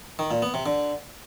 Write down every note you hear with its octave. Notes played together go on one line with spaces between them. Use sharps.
D#3
A#2
B3
C3
D3